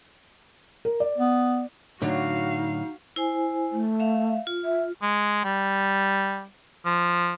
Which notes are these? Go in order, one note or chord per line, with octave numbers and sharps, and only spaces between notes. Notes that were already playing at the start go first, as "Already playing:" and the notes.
A#4
D5
B3
A2 D3 F#3 D#4 F#4 F5
E4 C5 G#5
A3
E5 F5
F4
E5
G#3
G3
F3